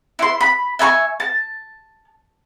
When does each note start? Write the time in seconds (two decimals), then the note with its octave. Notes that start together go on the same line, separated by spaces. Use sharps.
0.19 E4 C6
0.41 B5
0.79 E5 G#5 B5 C#6
1.20 A5